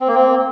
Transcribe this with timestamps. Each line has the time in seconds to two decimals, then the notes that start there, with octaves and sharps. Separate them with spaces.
0.01 C4
0.08 A#3
0.15 C4